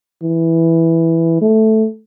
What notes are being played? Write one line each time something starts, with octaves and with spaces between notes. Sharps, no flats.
E3
A3